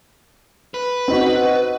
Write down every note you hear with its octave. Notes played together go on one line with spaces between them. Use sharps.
B4
C4 D#4 F#4